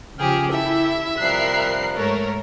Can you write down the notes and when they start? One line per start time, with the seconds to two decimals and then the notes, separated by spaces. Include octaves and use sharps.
0.18 C#3 F3 G4 G#4 G5 F6
0.51 E4 G4 A4 E5
1.20 C3 F3 G3 A#4 F#6 C7
1.94 G#2 A3 A#4 C#5